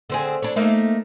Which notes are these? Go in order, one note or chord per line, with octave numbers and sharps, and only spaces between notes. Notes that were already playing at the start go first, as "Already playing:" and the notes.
D3 C4 G#4
D4 C#5
A3 A#3 D#4